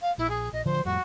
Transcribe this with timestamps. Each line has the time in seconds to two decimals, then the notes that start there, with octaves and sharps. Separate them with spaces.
0.01 F5
0.18 A#1 E4
0.29 G#4
0.52 A#1 D#5
0.65 A1 D3 F3 C5
0.85 F2 A2 G3 F#4